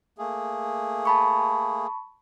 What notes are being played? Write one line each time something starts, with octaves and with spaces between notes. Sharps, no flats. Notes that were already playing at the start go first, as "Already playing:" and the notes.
A3 A#3 G#4
A5 B5 C#6